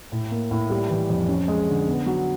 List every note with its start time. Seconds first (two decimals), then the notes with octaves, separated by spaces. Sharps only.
0.12 A2
0.31 A#3
0.51 A2
0.70 G3
0.90 E3
1.10 F2
1.28 C#4
1.48 G#3
1.68 D3
1.88 B3
2.06 F#3